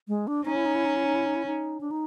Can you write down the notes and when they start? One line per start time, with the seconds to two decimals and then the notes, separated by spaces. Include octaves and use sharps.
0.08 G#3
0.27 D4
0.45 C#4 D#4
0.56 E4
0.66 D#4
0.75 E4
0.85 D#4
0.96 E4
1.05 D#4
1.15 E4
1.26 D#4
1.36 E4
1.46 D#4
1.81 D4
1.91 D#4